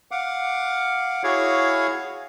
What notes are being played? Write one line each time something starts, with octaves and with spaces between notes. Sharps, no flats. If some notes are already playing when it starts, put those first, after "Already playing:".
F5 F#5 D6
E4 F#4 G#4 C#5 F5